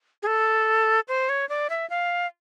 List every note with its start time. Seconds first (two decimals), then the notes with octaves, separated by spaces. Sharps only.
0.23 G#4
0.27 A4
1.08 C5
1.29 C#5
1.49 D5
1.70 E5
1.90 F5